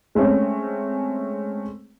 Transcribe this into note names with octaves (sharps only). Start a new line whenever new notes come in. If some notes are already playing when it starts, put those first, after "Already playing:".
G#3 A3 C4 C#4